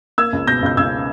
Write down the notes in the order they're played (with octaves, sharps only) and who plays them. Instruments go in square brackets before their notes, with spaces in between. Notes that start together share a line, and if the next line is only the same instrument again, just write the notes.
[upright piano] A#3 E6 G#6
C#2
B2 G6 A#6
C#2 G6
C#2 E6 G#6